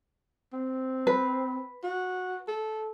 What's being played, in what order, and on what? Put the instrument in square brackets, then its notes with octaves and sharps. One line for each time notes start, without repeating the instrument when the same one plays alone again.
[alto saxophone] C4
[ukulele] B4
[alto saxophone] F#4
A4